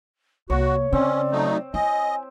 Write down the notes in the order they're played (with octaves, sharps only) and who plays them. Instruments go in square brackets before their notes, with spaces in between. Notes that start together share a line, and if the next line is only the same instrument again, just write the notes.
[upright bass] C2 [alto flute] A#3 [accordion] F#4 [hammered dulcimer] C#5
[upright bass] C#3 [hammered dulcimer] C4 [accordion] C#4 [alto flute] D5
[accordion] F#3 A3 D#4
[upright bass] E4 [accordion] D#5 [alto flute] G#5